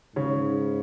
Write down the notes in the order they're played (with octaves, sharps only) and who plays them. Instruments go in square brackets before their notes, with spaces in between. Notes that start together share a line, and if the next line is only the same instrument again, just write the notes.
[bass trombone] G#2 [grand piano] C#3 C#4